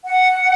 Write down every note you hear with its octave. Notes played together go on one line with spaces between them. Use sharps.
F#5